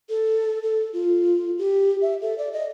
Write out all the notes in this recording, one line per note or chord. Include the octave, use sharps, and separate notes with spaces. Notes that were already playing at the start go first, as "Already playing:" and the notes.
A4
A4
F4
G4
E5
A4
D5
D#5